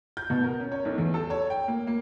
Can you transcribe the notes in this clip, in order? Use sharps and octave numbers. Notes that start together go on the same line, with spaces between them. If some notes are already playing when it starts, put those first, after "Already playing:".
G6
B2
A#4
C#4
C#5
B1
E2
A4
C#5
G5
A#3
A#3